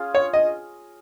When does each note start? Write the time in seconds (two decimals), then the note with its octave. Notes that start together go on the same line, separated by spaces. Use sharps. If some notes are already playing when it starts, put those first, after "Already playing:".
Already playing: C#4 F4 G#4
0.15 C#5
0.33 D#5